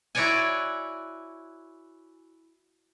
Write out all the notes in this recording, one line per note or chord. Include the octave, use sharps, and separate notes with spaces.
E4 F#4 C#5 D5 F#5 G#5